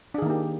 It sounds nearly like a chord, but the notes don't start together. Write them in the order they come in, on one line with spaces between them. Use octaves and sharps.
D4 G#4 D#3 A#3 G4